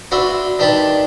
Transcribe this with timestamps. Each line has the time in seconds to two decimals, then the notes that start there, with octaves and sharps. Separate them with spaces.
0.11 D4 F#4 B4 E5 C6
0.59 D#3 D4 G4 B4 A5 B5